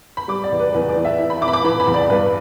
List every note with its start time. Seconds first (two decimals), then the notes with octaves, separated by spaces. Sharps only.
0.17 B5
0.28 G3 D6
0.44 D5
0.52 E2
0.59 B4
0.74 E2 B4
0.89 D5
0.97 E3
1.05 E5
1.19 E4
1.30 B5
1.41 E4 D6
1.48 B5
1.53 D6
1.64 E3 B5
1.80 B5
1.87 E2
1.94 D5
2.10 G2 B4